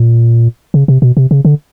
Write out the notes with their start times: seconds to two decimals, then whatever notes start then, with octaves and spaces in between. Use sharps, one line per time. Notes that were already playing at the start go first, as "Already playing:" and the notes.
Already playing: A#2
0.74 C#3
0.88 C3
1.02 B2
1.17 C3
1.31 C#3
1.45 D3